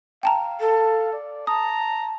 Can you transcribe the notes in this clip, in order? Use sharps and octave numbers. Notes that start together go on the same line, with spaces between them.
F5 G5 A5 A#5
A4
D5
A5 A#5 D#6